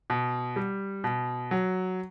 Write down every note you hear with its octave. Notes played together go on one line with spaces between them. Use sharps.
B2
G3
B2
F#3